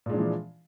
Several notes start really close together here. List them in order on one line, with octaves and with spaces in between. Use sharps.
A#2 G#3 D4 F3 E3